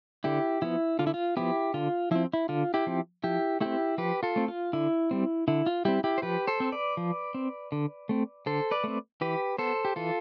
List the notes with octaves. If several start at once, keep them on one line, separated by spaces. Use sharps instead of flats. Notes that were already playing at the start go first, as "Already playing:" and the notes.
D3 E4 G4
F3 B3 E4
D3 F4
E4
F4
F3 B3 E4 G4
D3 F4
F3 C4 E4
E4
D3 F4
E4 G4
F3 C4
F3 E4 G4
A3 C4 E4 G4
F3 G4 B4
F4 A4
A3 C4
F4
D3 E4
G3 C4
D3 E4
F4
G3 C4 E4 G4
E4 G4
C5
F3 G4 B4
A4 C5
C4
B4 D5
F3
C4
D3
A3 C4
D3 A4 C5
B4 D5
A3 C4
E3 G4 B4
B3 A4 C5
G4
E3 F4 A4